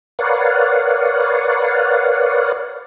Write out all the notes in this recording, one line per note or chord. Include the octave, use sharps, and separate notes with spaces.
A#4 B4 C#5 D5 F5 F#5